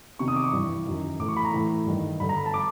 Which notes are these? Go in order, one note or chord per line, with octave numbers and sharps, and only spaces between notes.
E2 C3 D#3 C#6
D#6
D6
C#6
G2 E3
F#2 D#3
A2 E3 D6
C#6
B5
A#5
A2 E3
G2 D#3
G2 D3 B5
A#5
B5
A5
D6